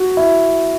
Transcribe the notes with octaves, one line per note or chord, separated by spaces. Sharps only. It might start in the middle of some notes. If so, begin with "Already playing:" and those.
Already playing: F#4
E4